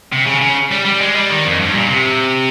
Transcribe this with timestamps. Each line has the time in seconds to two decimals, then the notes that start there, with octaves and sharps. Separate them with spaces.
0.12 C3
0.26 C#3
0.41 C#3
0.71 G3
0.85 G3
1.01 G#3
1.15 G3
1.30 D#3
1.45 F2
1.59 G2
1.74 A#2
1.89 C3